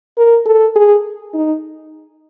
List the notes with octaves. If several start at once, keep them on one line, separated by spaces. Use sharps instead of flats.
A#4
A4
G#4
D#4